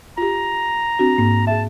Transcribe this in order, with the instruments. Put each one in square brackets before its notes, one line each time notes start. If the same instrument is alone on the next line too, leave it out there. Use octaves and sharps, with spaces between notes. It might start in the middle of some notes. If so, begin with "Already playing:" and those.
[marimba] F4 G4 [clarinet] A#5
[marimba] C4 D4 F#4
G#2 A#3
[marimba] G#4 E5 [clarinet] A5